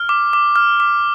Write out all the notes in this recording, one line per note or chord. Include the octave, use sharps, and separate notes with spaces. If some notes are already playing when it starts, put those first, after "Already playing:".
Already playing: F6
D6
D6
F6
D6